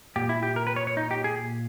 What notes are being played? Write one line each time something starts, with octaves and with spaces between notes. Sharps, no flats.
A#2 G4
E4
G4
A#4
B4
C#5
C#5
D#4
G4
G#4